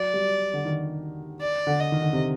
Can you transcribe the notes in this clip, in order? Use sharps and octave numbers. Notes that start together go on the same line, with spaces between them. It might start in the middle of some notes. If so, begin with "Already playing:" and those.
Already playing: F#3 D5
G3
D3
D#3
D5
D3
D#5
D#3
D3
C3